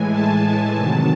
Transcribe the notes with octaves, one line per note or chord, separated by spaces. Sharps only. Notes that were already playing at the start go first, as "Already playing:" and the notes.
Already playing: A2 E3 G#3 G#5
A5
C3 D#3 F#3